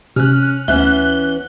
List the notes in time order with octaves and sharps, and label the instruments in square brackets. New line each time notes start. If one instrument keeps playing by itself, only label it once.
[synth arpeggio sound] C3 [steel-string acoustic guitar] C#4 [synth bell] F6 F#6
[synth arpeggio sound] D2 E5 [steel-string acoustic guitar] E3 B3 C#4 [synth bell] F#6 G7